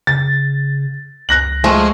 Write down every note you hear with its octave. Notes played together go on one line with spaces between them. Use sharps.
C#3 A6
C#2 F#6 A#6 F#7
F3 G#3 A3